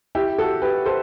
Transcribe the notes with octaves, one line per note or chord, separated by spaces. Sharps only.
E4 G4
F#4 A4
G4 B4
A4 C5